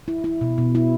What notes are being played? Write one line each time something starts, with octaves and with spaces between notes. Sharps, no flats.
E4
E4
B2
B2
E4